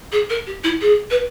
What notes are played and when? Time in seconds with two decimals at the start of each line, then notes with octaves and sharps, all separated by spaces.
0.12 G#4
0.29 A#4
0.46 G4
0.64 E4
0.81 G#4
1.10 B4